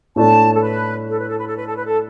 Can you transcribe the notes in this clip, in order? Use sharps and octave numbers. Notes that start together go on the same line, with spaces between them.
A2 A3 D4 A5
A4
B4
A4
B4
A4
B4
A4
B4
A4
B4
A4